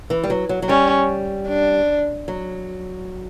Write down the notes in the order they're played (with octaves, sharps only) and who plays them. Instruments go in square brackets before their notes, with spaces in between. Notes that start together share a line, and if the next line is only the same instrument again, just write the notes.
[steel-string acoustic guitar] E3
G3
F#3
F#3
F#3
[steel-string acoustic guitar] G3 [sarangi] C#4
[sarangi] D4
[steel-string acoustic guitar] F#3